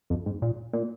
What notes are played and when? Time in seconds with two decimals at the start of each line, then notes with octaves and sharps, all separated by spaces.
0.10 F2
0.26 G#2
0.42 A#2
0.73 A#2